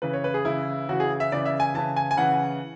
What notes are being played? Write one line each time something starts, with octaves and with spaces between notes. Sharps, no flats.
C#3 E3 B4
C#5
B4
G#4
C#3 E3 E4
C#3 E3 F#4
G#4
E5
C#3 E3 D5
E5
G#5
C#3 E3 A5
G#5
G#5
C#3 E3 F#5